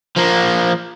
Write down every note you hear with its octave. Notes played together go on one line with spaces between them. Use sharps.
F3 A#3